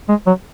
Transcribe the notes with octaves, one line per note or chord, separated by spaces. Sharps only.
G#3
F#3